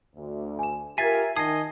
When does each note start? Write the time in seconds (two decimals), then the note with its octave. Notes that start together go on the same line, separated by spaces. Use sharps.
0.15 D2
0.59 G#5 E7
0.98 F4 G4 A#4 E5 G#5 G#6 A6 C7
1.36 D#3 D#5 G#5 A5 D#6 G#6 C7